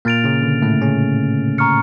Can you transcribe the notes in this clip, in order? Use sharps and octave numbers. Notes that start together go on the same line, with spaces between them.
A#2 A#3 F6 A6 D7 F7
C#3 C#4
D3
A2 A3
C#3 C#4
A#5 C#6 F6 C#7